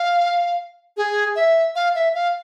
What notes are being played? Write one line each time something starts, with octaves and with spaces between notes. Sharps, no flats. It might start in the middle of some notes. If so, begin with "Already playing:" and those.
Already playing: F5
G#4
E5
F5
E5
F5